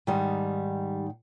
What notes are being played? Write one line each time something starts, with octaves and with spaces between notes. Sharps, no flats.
G#2 D#3 G3